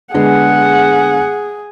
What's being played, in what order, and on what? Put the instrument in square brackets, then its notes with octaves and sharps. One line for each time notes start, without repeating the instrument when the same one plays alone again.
[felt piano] D3 G#3 B3 [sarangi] G#4 [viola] F#5